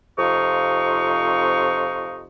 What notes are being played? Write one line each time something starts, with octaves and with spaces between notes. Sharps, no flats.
F2 C3 D#4 F4 C#6